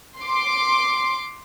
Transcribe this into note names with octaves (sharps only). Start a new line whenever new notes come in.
C6 D6